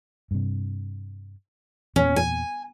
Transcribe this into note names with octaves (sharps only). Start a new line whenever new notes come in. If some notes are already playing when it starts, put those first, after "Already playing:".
G2 C3
E2 A#2 C#4
G#5